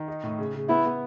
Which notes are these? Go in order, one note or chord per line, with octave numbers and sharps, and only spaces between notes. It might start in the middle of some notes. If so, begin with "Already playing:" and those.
Already playing: D#3
D#4
A2
C#3
C#3
B3 E4
B3